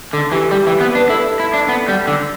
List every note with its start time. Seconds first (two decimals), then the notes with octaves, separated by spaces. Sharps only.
0.13 D3 A4
0.32 E3 G4
0.51 G3 G4
0.67 E3
0.71 G4
0.80 B3
0.91 D4 B4
1.10 E4 A4
1.40 E4
1.54 D4
1.69 B3
1.88 G3
2.08 D3